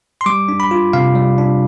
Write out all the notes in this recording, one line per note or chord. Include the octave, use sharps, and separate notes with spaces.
C6
G3 D6
D4
B5
F4
C3 F5
G3
D4